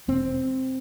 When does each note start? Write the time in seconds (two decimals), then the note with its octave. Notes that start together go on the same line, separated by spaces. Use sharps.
0.08 E1 C4